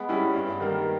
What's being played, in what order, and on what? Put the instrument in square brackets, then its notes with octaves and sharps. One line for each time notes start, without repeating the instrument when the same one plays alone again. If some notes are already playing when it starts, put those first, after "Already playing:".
Already playing: [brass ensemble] G#3 B3
[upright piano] G3 C#4 E4
[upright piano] G2 [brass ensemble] G#3 B3
[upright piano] D#3 G3 A#3